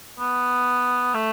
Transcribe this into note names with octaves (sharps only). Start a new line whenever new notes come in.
B3
A3